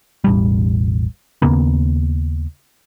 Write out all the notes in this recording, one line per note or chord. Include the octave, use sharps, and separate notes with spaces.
E1 A1 G3
D#2 C#3 A#3 B3